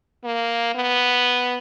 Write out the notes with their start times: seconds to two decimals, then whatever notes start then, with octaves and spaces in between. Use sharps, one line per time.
0.25 A#3
0.75 B3